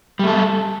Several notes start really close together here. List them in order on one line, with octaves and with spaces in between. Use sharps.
G3 A3 A4